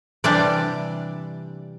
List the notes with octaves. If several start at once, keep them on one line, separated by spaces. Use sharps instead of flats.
C3 E3 G3 D4 D5